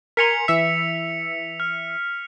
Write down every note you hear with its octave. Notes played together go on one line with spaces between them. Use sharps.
A#4 G#5 C6 B6 C#7 F7
E3 E5
F6